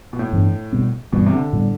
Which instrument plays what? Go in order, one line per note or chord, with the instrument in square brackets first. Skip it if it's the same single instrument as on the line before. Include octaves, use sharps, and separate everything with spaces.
[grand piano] B2
A2
[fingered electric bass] G2 E3 B3 D4
B2 G3 B3
[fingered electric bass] G2 E3 G3 [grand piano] B2
[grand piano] C3
D3
[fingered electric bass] A2 G3 B3